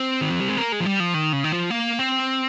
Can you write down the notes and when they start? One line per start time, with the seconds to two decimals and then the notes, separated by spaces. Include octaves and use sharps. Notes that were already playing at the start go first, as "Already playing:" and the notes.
Already playing: C4
0.21 D#3
0.30 F3
0.39 G3
0.49 G#3
0.57 A#3
0.72 G#3
0.80 F3
0.86 G3
1.00 F3
1.14 D#3
1.33 C#3
1.44 D#3
1.52 F3
1.70 A#3
1.99 C4